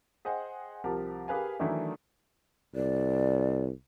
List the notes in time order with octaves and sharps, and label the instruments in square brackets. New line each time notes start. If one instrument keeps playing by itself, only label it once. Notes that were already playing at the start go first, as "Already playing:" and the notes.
[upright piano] G#4 C5 D#5 F#5 G5
C2 F3 G4 A#4 A5
G4 G#4 A#4 B4 F5 G#5
D#3 E3 F#3 A3 D4 E4
[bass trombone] C2 [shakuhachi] D5